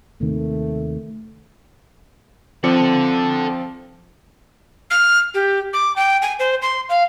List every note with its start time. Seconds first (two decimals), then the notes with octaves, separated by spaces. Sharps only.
0.21 D#2 C3 D#3 A3
2.64 F3 C4 A4 D5 C#7
4.91 F6
5.34 G4
5.73 D6
5.96 G5
6.22 G#5
6.39 C5
6.62 C6
6.89 F5